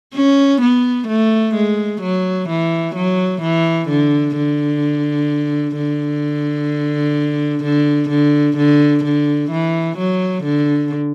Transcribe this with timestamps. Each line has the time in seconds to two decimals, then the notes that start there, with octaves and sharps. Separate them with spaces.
0.15 C#4
0.61 B3
1.08 A3
1.55 G#3
2.02 F#3
2.49 E3
2.95 F#3
3.42 E3
3.89 D3
4.36 D3
5.76 D3
7.63 D3
8.10 D3
8.57 D3
9.04 D3
9.51 E3
9.97 F#3
10.44 D3